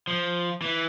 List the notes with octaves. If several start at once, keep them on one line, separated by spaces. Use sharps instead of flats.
F3
E3